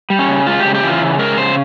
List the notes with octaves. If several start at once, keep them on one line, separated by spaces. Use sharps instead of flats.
G3
C#4
C#3
G#3 F4
G4
C#3
G4
E3 F4
C#3
G#3 A#4
C#3 C5